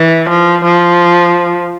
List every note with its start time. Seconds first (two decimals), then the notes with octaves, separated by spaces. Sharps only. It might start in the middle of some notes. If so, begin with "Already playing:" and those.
Already playing: E3
0.30 F3
0.65 F3